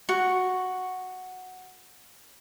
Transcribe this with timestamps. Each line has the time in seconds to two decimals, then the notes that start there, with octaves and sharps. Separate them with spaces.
0.09 F#4 C#6